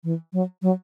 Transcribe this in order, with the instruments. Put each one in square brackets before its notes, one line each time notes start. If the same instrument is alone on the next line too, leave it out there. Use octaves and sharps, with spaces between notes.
[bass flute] E3
F#3
F#3